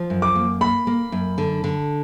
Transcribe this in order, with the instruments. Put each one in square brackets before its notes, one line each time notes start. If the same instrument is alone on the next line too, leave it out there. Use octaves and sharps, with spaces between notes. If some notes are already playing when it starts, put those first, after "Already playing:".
Already playing: [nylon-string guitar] F3
F#2
[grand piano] D6
[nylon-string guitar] A#3
[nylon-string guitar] A#3 [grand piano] B5
[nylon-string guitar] A#3
F#2
D3
D3